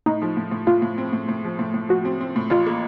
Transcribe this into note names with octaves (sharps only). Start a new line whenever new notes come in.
A2 D#4
F3
A2
A2
A2 F4
A2
C4
A2
A2
F3
A2
A2
F3 F#4
C4
C4
A2
A1 F4
A#3